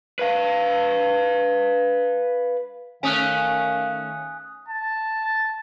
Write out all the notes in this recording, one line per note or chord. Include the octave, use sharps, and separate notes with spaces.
B4 F5
D#3 A3 C#4 F5 G#5 D#6 F#6
A5